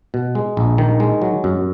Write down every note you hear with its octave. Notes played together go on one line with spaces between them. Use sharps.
B2
G#3
A#1
D#3
G#3
F#3
F#2